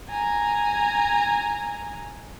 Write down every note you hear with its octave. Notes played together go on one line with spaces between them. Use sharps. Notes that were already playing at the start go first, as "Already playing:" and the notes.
G#5 A#5